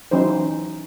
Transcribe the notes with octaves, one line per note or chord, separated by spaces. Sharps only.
E3 F#3 C#4 D#4 C5